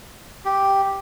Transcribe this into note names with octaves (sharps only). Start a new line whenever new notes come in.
G4